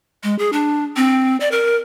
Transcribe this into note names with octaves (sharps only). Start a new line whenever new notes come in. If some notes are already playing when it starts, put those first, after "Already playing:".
G#3
G#4
D4
C4
D5
A#4